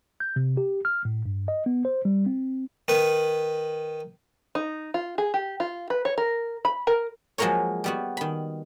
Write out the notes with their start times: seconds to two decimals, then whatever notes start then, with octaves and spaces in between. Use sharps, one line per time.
0.20 G6
0.36 C3
0.57 G4
0.85 F6
1.05 A2
1.26 G2
1.48 D#5
1.66 B3
1.85 C5
2.05 G3
2.26 C4
2.88 D#3 B4
4.55 D#4
4.94 F4
5.18 G#4
5.34 G4
5.60 F4
5.90 B4
6.05 C#5
6.18 A#4
6.65 B5
6.87 A#4
7.38 F3 F#3 G#3 A#3 A#4 C#5
7.84 G3 B3 F#4
8.17 D#3 B5